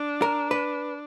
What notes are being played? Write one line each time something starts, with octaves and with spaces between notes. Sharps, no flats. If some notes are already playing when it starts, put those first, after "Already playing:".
Already playing: D4
A#4
B4